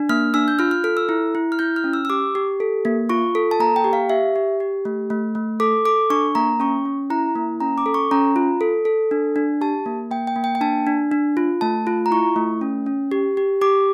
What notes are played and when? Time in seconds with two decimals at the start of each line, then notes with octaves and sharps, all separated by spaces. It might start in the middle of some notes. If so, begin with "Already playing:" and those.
Already playing: D4
0.09 A#3 F6
0.34 D4 E6
0.48 G6
0.59 F4 F6
0.71 F6
0.84 A4 F6
0.97 E6
1.09 E4
1.35 E4
1.52 F6
1.59 E4 G6
1.76 F6
1.84 C#4
1.93 E6
2.05 E6
2.10 G4 D6
2.35 G4
2.60 A4
2.85 A#3
3.09 F4 C#6
3.35 A4
3.51 A5
3.60 A#3 A#5
3.76 G5
3.84 G4
3.93 F5
4.09 G4 E5
4.36 G4
4.60 G4
4.85 A3
5.10 A3
5.35 A3
5.60 A4 D6
5.85 A4 D6
6.10 D4 C#6
6.35 A#3 A#5
6.60 C#4 C#6
6.85 C#4
7.10 E4 A#5
7.36 A#3
7.60 C#4 A#5
7.78 D6
7.86 A4
7.94 C#6
8.11 C#4 A#5
8.36 F4
8.61 A4
8.85 A4
9.11 D4
9.36 D4
9.61 G4 A5
9.86 A#3
10.11 A#3 G5
10.27 G5
10.36 A#3
10.44 G5
10.55 G5
10.61 D4 A5
10.87 D4
11.11 D4
11.37 F4
11.61 A3 A5
11.87 F4
12.06 A#5
12.11 E4 C#6
12.36 A3
12.61 C#4
12.86 C#4
13.11 G4
13.37 G4
13.61 G4 D6